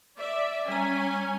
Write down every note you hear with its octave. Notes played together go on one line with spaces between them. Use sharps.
D5 E5
G3 C#4 G#5 A#5